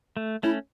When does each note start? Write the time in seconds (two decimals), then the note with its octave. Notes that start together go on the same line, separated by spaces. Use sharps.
0.17 A3
0.43 A3 C#4 E4